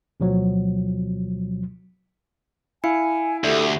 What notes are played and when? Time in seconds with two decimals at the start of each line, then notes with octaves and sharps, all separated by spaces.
0.20 D2 B2 F3 F#3
2.84 E4 F5 G#5 C#7
3.44 D2 G4 A4 E5